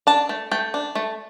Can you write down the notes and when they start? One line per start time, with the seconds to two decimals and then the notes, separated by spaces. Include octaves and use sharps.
0.07 D4 A5
0.29 A3
0.51 A3 G5
0.74 D4
0.95 A3